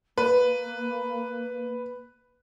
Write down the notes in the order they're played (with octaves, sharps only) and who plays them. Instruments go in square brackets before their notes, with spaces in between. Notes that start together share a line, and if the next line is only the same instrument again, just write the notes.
[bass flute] A#3 [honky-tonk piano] B4